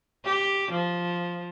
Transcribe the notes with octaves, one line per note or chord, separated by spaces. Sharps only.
G4
F3